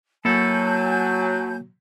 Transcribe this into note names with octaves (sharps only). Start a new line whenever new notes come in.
F#3 A#3 E4 A4 G#5 A5 G6